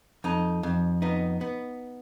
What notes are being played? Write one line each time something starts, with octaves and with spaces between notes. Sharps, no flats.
F2 D#4
F2
B3 D#4
B3